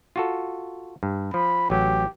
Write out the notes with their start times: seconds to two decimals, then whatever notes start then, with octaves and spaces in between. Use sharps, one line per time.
0.16 F4 F#4 A4
1.03 G2
1.34 F3 B5
1.70 A1 F#3 G4